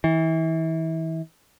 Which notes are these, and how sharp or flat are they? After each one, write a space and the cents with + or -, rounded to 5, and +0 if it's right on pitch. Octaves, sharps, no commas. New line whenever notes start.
E3 -30